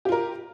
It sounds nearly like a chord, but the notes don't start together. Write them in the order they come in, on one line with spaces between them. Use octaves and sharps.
G4 F4 A#4